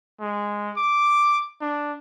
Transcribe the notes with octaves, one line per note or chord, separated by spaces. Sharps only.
G#3
D6
D4